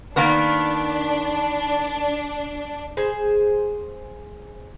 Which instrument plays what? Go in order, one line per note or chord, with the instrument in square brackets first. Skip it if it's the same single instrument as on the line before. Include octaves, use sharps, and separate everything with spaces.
[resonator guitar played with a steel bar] D#3 A#3 B3 [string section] D4
[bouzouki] G#4 C5